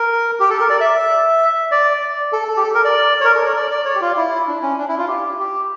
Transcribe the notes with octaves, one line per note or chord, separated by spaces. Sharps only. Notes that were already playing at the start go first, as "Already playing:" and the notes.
Already playing: A#4
G4
A4
A#4
D5
E5
D5
A4
A4
G4
A4
A#4
D5
C#5
A#4
A4
C#5
D5
D5
C#5
G4
F4
E4
D4
C#4
D4
E4
F4
G4
G4